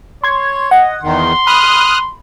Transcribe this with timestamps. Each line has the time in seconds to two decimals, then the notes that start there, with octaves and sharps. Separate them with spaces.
0.24 C#5 C6 G#6
0.71 D#5 F#5
1.03 E2 D#3 C6
1.47 B5 D#6 F6 F#6